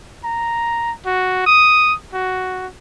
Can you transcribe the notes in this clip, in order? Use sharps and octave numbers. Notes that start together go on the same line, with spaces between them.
A#5
F#4
D#6
F#4